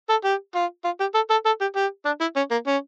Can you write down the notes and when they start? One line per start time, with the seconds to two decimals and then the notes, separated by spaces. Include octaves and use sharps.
0.10 A4
0.25 G4
0.55 F4
0.85 F4
1.00 G4
1.15 A4
1.30 A4
1.45 A4
1.61 G4
1.76 G4
2.05 D4
2.21 E4
2.36 C#4
2.51 A#3
2.67 C#4